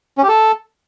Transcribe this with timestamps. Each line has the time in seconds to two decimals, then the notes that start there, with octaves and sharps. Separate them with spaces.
0.18 C#4
0.23 G4
0.28 A4